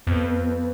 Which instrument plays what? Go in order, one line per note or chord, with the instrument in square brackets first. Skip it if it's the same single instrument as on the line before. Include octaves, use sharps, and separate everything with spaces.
[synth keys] F2 [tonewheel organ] B3